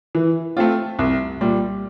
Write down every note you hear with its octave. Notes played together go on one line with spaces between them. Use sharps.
E3
A3 C4 F4
C2
A#2 G3